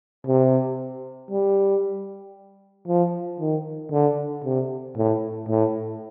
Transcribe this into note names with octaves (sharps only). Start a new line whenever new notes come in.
C3
G3
F3
D#3
D3
C3
A2
A2